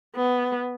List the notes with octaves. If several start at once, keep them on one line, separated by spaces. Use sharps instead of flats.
B3